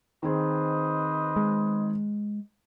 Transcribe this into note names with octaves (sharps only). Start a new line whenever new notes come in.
D#3 C4 G#4 B4 C5 D#5
G#3